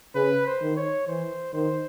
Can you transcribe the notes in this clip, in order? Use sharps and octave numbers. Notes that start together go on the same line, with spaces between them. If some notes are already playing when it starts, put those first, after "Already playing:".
C#3 B4
C5
D#3
C#5
E3 C5
D#3 C5